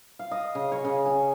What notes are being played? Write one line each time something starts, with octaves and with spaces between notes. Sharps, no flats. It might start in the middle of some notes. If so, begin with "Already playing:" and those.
F5
D#5
C#3
C#5
C#3
G#5